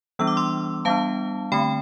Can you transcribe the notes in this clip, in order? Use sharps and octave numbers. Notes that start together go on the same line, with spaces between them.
E3 G3 B3 D4 E6
D6
C6 E6
G3 B3 D4 F5 A5
D3 A3 C4 G5 B5